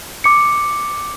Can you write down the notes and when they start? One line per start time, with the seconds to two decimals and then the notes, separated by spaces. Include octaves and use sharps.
0.24 D6 C#7